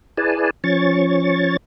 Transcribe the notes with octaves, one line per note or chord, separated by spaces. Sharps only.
E4 G#4 B4 D5 G#5 A5
F3 C#4 C#5 C#6 A6